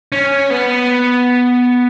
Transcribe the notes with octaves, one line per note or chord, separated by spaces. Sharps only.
C#4
B3